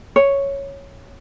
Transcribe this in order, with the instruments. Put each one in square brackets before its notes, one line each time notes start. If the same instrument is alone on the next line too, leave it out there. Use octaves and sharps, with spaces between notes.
[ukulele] C#5